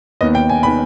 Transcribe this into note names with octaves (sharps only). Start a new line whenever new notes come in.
D#2 D#3 B3 D#5
G5
G#5
D#3 B3 B5